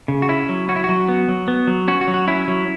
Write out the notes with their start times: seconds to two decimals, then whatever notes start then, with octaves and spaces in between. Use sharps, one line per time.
0.08 C#3
0.22 F#4
0.29 C#4 E4
0.49 F#3
0.68 C#4 F#4
0.76 E4
0.84 F#3 F#4
1.09 B3
1.28 F#3
1.48 B3
1.67 F#3
1.88 C#4 F#4
2.01 F#4
2.08 F#3
2.14 F#4
2.28 C#4 E4
2.48 F#3